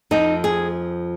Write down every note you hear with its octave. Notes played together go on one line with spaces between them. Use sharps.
F2 F3 C4 D#4
G#4